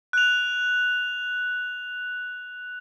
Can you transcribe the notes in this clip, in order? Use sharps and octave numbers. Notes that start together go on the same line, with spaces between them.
F#6 F7